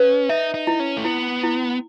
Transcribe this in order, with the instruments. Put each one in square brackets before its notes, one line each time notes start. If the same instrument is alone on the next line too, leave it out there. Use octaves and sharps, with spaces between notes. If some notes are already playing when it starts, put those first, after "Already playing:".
Already playing: [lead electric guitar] C#4 [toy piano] B4
[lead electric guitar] D#4 [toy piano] E5
[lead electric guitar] D#4
[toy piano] E4
[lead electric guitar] C#4
A3
[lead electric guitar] B3 [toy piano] E4
[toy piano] E4